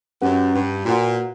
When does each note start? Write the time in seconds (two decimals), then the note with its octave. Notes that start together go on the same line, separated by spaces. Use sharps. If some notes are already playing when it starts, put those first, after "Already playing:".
0.22 F#2 C#4 G4 B4 F#5
0.54 G2
0.85 A#2 F#4 B4 F#5